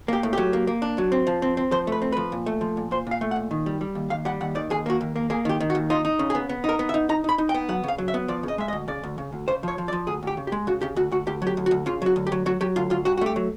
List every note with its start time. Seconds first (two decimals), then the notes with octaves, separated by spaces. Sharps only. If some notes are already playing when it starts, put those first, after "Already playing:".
0.08 A#3 G4
0.23 A2
0.33 F#3 G4
0.53 A#3
0.67 A#3
0.82 D4
0.98 F#3
1.12 C4
1.27 F3
1.42 C4
1.57 C4
1.71 F3 C5
1.87 A3 B4
2.02 C4
2.12 F3 B4
2.32 A#2
2.46 A3
2.61 F3
2.77 A#2
2.91 A#2 C5
3.07 A#2 F5
3.21 A3
3.31 F#5
3.36 A#2
3.51 D#3
3.66 G3
3.81 G3
3.95 D#2
4.10 D#2 F5
4.25 G3 F#5
4.41 D#2 F#5
4.55 D#3 D5
4.70 D#2 G#4
4.86 A#3 F#4
5.01 D#2
5.16 A#3
5.30 A#3 G#4
5.45 D#3 G4
5.60 D#3
5.70 F#4
5.75 D#2
5.90 D#4 F4
6.05 D#4
6.19 C#3
6.30 G#4
6.35 B3
6.49 B3
6.64 D#4 A#4
6.79 B3
6.89 E5
6.94 D#4
7.09 D#4 A#5
7.24 D#4 B5
7.38 D#4
7.49 G5
7.54 B3
7.69 F#3 F#5
7.83 C#3 F5
7.98 F#3
8.08 E5
8.14 B3
8.28 F3 D5
8.43 C#3 D#5
8.58 G#3 E5
8.68 D#5
8.73 D2
8.88 C#3 D5
9.03 D2
9.18 C#3
9.33 D2
9.48 C#3 C5
9.63 F3 C#5
9.78 F3
9.88 D5
9.93 F3
10.07 D2 G#4
10.23 D2 G4
10.37 C#3
10.47 G4
10.52 G#3
10.67 C#3 F#4
10.81 C#3 G4
10.96 D2 F#4
11.12 D2 F#4
11.27 D2 G4
11.42 F#3 G4
11.57 D2
11.66 F#4
11.71 D2
11.86 C#3 F4
12.02 F#3 F#4
12.16 D2
12.27 G4
12.32 F#3
12.46 F#3 F#4
12.61 F#3 G4
12.76 D2 F4
12.90 D2 F4
13.05 G2 F#4
13.17 F#4
13.21 A3 G4
13.36 F#3